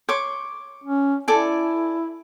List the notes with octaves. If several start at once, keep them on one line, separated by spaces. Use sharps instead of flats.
C#5 C6 D6
C#4
E4 A4 D5 G#5